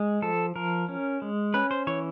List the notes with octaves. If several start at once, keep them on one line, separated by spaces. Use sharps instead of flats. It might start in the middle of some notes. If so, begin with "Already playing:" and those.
Already playing: G#3
F3 A4
F3 A#4
C#4
G#3
C#4 B4
C5
E3 C#5